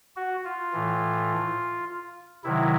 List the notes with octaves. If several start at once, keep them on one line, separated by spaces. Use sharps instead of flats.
F#4
F4
A2 E3
C3 D#3 F#3 E4